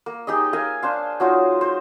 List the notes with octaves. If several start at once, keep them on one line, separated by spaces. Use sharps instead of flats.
A#3
D#4 G4 G#4 D#5
A#4 E5 F5 G#5
D4 C5 F5
F#3 D#4 F4
C5